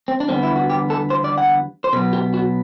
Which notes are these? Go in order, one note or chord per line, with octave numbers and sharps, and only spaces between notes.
C4
D4
E2 D3 G3 B3 C4
E4
F#4
G4
A4
C5
D5
F#5
C5
B2 F#3 B3 B4
G4
F#4